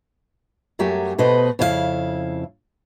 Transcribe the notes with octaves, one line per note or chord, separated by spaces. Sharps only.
F#2 F#3 A3 G4 G#5
B2 A3 B4 C5 D#5
F2 C#3 E4 G#4 F5